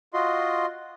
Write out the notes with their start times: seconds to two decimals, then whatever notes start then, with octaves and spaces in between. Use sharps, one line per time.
0.14 F4 F#4 D#5 C6